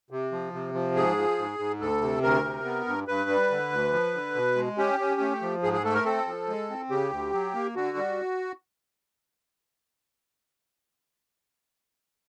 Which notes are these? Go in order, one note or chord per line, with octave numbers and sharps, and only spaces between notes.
C3
F3
C3
F3
G#2 G#4
F3
G#2
G#2
D2 A4
C3
D2 A#4
C3
B3
G2
G2 B4
G3
D3
D2
F3
D3
B2
G#3
C#4 G4
C#4
A3
F3
G#2 G#4
G#4
A3 A4
A#4
C4 A4
F3
G#3
C4
C#3 G4
D2
F#3
A#3
D3 F#4
G3